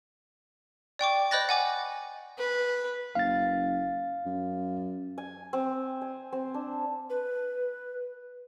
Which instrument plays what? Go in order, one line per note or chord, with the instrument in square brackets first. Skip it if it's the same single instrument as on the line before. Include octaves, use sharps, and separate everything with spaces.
[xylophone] D5 G5 C#6 D6
C5 D#5 B5 F#6 A6 A#6
F#5 G#5 D6
[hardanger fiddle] B4
[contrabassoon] F#1 [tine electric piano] F5 A6
[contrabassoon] F#2
[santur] G#5
C4
G#5
C4
D4
[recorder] B4